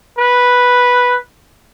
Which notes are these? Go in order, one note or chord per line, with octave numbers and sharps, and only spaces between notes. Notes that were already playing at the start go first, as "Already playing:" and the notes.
B4